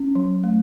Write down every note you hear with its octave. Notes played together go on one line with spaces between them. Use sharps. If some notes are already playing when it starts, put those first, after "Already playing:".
Already playing: C#4
F#3
A3